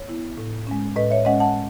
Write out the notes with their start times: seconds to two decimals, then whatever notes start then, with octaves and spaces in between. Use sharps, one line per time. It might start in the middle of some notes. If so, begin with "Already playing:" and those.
Already playing: C#5
0.08 B3 E4
0.38 A2
0.67 G#3 C#4
0.96 A2 B4 D#5
1.10 C#5 E5
1.25 G#3 C#4 D#5 F#5
1.40 F#5 A5